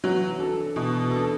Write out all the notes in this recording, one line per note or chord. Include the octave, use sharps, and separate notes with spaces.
E3 F#3
D4 A4
B2 E3
A4
D4